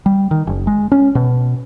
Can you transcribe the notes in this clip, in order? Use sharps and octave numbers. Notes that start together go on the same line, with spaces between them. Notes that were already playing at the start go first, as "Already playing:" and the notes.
G3
D#3
F#1
G#3
C#4
B2